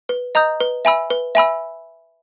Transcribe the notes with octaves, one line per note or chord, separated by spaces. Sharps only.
B4
D#5 A#5 D#6 G6
B4
E5 G#5 B5 E6
B4
E5 G#5 B5 E6